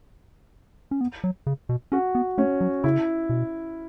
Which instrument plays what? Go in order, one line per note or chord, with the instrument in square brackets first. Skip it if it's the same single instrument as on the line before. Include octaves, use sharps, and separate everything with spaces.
[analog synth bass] C#4
B3
F#3
C#3
B2
[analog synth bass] C#4 [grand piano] F#4
[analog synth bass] B3
[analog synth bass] A3 [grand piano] C#4
[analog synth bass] F#3
[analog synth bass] C#3 [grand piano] E4
[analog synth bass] B2